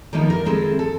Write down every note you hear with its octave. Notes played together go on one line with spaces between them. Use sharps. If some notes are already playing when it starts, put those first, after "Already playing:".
D#3 F3 A#3 B3 D#4 E4
A#4
D#3 G#3 C4 E4 G#4 A4
A4